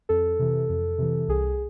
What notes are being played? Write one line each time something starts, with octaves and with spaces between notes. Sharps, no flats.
F2 A4
C3 E3
F2
C3 E3
C2 G#4